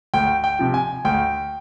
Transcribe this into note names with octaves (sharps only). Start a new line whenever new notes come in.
D2 G5
G5
C3 F3
G#5
D2 G5